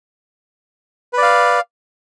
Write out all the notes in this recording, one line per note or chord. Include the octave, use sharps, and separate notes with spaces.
B4 D5 F5